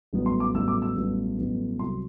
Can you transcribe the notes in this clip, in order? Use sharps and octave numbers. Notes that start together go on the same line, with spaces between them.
A1 G2 F#3 B3
C6
D6
A1 G2 F#3 B3 E6
D6
E6
A1 G2 F#3 B3
A1 G2 F#3 B3
C2 C3 F#3 C6